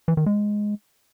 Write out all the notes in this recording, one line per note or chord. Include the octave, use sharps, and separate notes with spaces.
E3
D#3
G#3